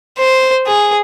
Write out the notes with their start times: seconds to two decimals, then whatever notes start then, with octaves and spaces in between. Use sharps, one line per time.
0.18 C5
0.67 G#4